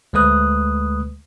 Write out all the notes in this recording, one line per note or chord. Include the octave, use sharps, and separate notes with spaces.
D2 G#3 A3 B4 D#6 F#6